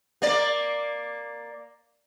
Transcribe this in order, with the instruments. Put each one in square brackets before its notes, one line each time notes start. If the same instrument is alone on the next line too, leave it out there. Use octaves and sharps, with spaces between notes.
[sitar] A#3 D5